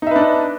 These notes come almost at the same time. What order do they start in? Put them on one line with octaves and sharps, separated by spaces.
D#4 E5 B4 D4 D#5